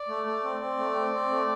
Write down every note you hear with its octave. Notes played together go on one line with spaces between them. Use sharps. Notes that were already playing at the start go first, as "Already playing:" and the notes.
Already playing: D5
A3
A3
C4
C4
A3
C4
C4
A3